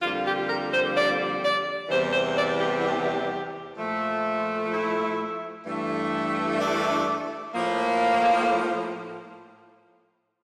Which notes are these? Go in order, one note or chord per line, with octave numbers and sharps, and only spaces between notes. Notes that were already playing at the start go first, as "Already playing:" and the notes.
F2 D3 G3 A#3 F4
G4
A#4
C5
D5
D5
E2 C3 E3 G3 C5
C5
D5
G4
G4
A#2 F3 A3
E4
G2 E3 A3
D4
A2 F3 A#3